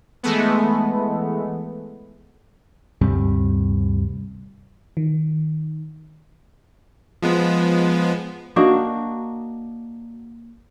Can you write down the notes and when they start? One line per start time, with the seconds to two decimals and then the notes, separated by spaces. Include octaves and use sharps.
0.23 E3 G#3 A3 B3
3.01 D2 G2 C3 G3
4.97 D#3
7.23 F3 G#3 B3
8.56 A#3 D4 D#4 F#4